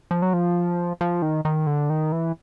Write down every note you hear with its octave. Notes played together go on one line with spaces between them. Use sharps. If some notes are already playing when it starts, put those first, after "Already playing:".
F3
F#3
F3
F3
D#3
D#3
D3
D#3
E3